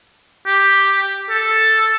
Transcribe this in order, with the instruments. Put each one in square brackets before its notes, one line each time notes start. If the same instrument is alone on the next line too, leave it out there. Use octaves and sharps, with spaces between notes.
[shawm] G4
A4